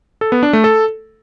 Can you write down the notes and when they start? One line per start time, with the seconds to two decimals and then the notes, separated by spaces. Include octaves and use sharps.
0.21 A4
0.32 B3
0.43 D4
0.53 A3
0.64 A4